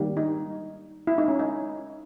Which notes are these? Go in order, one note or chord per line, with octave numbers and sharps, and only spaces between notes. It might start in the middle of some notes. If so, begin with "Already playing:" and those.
Already playing: D#3 G3 A#3
D#4
E4
D#4
C#4
D#4